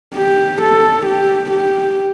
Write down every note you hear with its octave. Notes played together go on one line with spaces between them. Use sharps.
G4
A4
G4
G4